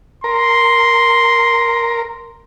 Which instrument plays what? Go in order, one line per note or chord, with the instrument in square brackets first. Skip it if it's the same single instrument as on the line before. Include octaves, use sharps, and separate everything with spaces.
[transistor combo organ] A#4 [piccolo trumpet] C6